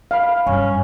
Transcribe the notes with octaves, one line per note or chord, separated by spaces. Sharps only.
F5 B5
G2 C#4